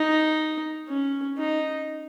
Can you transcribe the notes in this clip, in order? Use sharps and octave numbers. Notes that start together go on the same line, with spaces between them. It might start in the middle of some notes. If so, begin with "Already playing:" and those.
Already playing: D#4
C#4
D#4